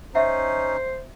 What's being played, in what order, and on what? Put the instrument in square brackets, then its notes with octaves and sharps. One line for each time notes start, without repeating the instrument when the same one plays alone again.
[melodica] C#4 D#4 [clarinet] C5 [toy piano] D#5 E5 F#5